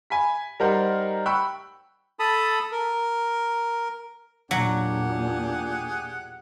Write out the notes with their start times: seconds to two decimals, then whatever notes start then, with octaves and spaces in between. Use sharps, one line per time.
0.10 G#5 B5 B6
0.60 G3 D#4 A#4 C5 F#5
1.26 G5 B5 C#6 E6 F#6
2.19 A4 A5 B5 D#6
2.72 A#4
4.51 E2 A#2 F#3 D4 G4 G#4 F#5